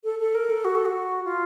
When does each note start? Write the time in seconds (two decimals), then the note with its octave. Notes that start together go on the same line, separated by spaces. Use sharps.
0.04 A4
0.19 A4
0.35 A#4
0.50 A4
0.65 F#4
0.75 A4
0.85 F#4
1.25 F4